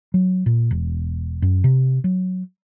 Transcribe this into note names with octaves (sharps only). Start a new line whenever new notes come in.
F#3
A#2
E1
F#2
C3
F#3